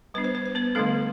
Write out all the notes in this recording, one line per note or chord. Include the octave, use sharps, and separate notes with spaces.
G3 B3 D4 B4
C5
B4
C5
B3 B4
D3 G3 A3 B3 D4 A4